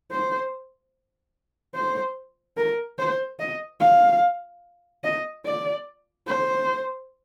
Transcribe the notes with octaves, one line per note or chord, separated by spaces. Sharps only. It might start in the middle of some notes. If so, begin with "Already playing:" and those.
C5
C5
A#4
C5
D#5
F5
D#5
D5
C5